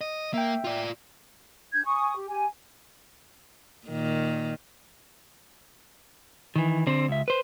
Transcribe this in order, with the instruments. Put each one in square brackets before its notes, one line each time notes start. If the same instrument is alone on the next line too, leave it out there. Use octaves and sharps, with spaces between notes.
[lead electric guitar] D#5
[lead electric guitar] A#3 [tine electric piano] E5 G5
[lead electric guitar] F4 D5
[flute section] D4 G6 G#6
G#5 C#6 D#6
G4
G4 G#5
[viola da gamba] A#2 D#3
[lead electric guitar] D#3 E3
D3 C4
C#2 E5
B4 C5